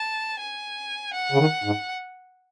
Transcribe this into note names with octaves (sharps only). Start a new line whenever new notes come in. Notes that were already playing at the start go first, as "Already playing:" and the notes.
Already playing: A5
G#5
F#5
C#3
D#3
G#2